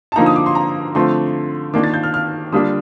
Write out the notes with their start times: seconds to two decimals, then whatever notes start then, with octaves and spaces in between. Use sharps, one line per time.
0.12 A5
0.16 D3 F3 A#3 D#4 A#5
0.26 D#6
0.36 D6
0.46 C6
0.55 A#5
0.95 D3 F3 A3 C4 F4 C6
1.74 D#3 A#3 D4 F4 D6
1.84 A6
1.94 G6
2.03 F6
2.14 F6
2.52 D3 G3 A#3 D4 F4 D#6